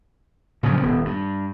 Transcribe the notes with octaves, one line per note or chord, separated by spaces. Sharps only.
A#2 C#3 F3 F#3
D#1 B3
G2